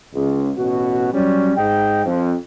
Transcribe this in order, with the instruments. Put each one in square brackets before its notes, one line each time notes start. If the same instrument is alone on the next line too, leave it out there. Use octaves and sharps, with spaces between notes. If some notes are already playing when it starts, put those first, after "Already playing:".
[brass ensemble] C#2
A1 B2 F#4
F#3 G3 C#4
G#2 D#5 G5
F2